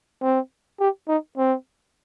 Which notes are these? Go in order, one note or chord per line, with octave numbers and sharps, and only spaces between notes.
C4
G4
D#4
C4